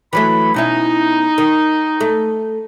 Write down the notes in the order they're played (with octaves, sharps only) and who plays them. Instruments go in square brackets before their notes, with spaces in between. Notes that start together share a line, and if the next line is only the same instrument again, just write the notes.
[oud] E3 F#3 A3 [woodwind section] B5
[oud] B2 C#4 E4 [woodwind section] D#4
[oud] D#3
A3